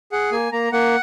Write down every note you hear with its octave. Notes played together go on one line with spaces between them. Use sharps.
G#4 F#5
A#3 G#5
A#3 A#5
A#3 F#5